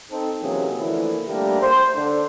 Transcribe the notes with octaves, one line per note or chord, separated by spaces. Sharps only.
C4 D#4 A4
C3 E3 F#3 A#3 C#4 G#4
D3 E3 F3 A3 A#3 E4
G3 A3 A#3 D4 G4 A#4
C5
D3 D4